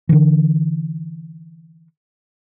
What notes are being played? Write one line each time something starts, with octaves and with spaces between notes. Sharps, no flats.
D3 E3